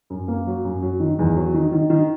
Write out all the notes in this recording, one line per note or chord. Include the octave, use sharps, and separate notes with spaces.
F#2
A#3
F#3
F#2
F#3
D#3
E2
F#3
D#3
D#3
D#3